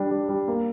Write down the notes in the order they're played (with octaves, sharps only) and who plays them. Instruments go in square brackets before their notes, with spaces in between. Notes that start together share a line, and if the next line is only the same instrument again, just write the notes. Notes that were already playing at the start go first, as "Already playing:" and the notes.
Already playing: [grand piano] G3 D4
G3
G3
A#3